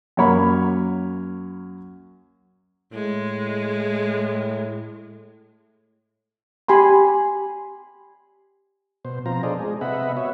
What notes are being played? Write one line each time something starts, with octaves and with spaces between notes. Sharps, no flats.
F#2 A#3 C#5 B5
A2 G#3
G4 G#5 B5 C6
B2 C5
B2 F3 C4 F4 A#5
D4 G#4 A4 C5 D5 D#5
G#3 G#4
C3 B3 D#5 E5 F#5 B5
F#4 C#5 E5